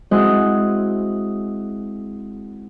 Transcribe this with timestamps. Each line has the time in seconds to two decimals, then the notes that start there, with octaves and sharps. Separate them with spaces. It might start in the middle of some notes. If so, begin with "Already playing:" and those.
0.11 G#3 C4 E4 F#4 D#5 F#5